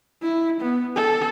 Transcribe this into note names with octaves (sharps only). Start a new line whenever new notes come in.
E4
B3
A4